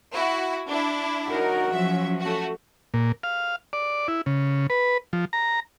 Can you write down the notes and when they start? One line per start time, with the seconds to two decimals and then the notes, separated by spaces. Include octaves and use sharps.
0.12 E4 F#4
0.68 D4 E4
1.30 D#4 F#4 A#4 C#5
1.72 F3 F#3 C#4 E5
2.20 A3 F#4
2.94 A#2
3.23 F5
3.73 D5
4.08 E4
4.26 C#3
4.70 B4
5.13 F3
5.33 A#5